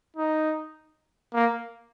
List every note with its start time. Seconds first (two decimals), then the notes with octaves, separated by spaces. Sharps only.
0.17 D#4
1.34 A#3